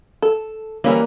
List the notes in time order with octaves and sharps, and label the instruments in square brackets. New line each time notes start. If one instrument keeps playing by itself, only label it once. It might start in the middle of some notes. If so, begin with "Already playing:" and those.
[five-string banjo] A4
[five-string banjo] E3 G3 C#4 [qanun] A#3